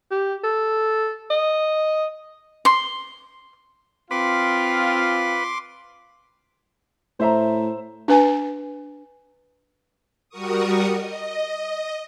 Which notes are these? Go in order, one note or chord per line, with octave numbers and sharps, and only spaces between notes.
G4
A4
D#5
C6
C4 F4 B4 C6 D6
A2 C5 E5 A#5
D4 B4 G#5
G3 F#4 A#4 C#6 D#6
D#5